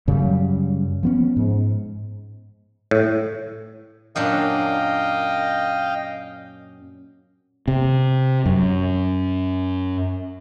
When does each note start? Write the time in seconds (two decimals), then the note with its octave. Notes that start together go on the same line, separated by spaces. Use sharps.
0.08 F#2 C#3 F#3 G3
1.03 F3 B3 C#4
1.36 G#2
2.91 A2
4.16 F#2 A#2 D4 D#5 F5 G5
7.68 C3
8.46 F#2